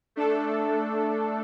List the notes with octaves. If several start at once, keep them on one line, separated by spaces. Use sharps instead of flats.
A3 D4 A4